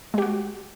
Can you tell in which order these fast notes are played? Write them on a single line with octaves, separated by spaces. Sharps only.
G#3 G4 F#4